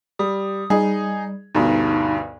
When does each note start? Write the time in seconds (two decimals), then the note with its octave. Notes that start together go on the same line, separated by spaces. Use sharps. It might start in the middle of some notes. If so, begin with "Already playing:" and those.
0.19 G3 D#6
0.70 G3 D#4 G#4
1.55 D2 G2 B2 D#4